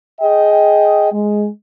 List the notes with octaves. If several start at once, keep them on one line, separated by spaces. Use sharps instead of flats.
G#4 D#5 G5
G#3